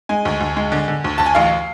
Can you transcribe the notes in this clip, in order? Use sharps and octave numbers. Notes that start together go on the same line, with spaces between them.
G#3 G#5
D2
D2
G#3
D3
D3
D2
D2 A5
G#5
A1 F5